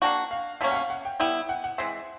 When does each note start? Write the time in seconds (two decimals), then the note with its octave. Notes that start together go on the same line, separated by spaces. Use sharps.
0.02 A#3 D4 F#4 G5
0.31 F5
0.61 B2 G3 A#3 C#4 E5
0.71 F#5
0.75 F5
0.90 F#5
1.05 G5
1.20 G3 B3 E4 G5
1.49 F#5
1.64 F#5
1.78 E3 G#3 C4 E5